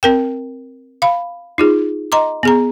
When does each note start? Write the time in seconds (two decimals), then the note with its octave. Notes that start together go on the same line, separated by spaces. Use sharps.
0.03 C4 A#4 G5
1.02 F5 B5
1.58 D#4 F4 G#4
2.12 D#5 A#5 C6 D6
2.43 B3 G#4 A#5